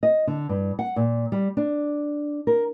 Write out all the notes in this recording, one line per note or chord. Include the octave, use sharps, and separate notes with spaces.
D#5
D3
G2
F#5
A#2
G3
D4
A#4